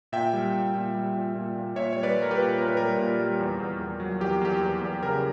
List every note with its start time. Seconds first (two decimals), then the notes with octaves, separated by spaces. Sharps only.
0.12 A#2 E5 G5
0.33 G3
0.54 A#2
0.75 A#2
0.95 G3
1.14 A#2
1.35 A#2
1.55 A#2
1.75 A#2 C#5 E5
1.93 G3 C#5
2.03 B4 D5
2.17 G3 A#4
2.31 G4 B4
2.38 A#2
2.58 A#2 A#4
2.68 B4
2.77 G3 A#4
2.98 A#2
3.19 G3
3.40 E2
3.60 E2
3.80 E2
4.00 F#3
4.20 E2 G4
4.41 E2 G4
4.61 E2
4.81 E2
5.03 C#3 A#4